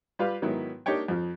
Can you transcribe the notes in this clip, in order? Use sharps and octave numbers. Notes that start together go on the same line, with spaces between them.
G3 F4 G4 B4 F5
G#2 D#3 F#3 B3 E4
A#3 D4 D#4 G4 C#5 G5
F2 F3